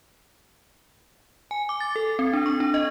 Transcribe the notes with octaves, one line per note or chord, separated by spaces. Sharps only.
G#5
D6
A6
A4
C4
D4
C#6
D4
D#5